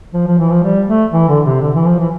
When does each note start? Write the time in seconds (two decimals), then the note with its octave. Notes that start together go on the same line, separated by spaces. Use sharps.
0.14 F3
0.27 F3
0.39 E3
0.51 F3
0.63 G3
0.87 A3
1.13 E3
1.28 D3
1.46 C3
1.61 D3
1.75 E3
1.86 F3
2.00 E3